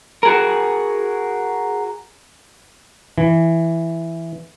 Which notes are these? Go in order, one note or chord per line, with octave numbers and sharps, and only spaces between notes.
F#4 G#4 A#4
E3